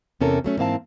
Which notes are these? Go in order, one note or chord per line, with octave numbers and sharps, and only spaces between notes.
E2 C3 C#4 A4 A#4
F#3 A3 C#4
G#2 E3 A#3 C4 F5 A5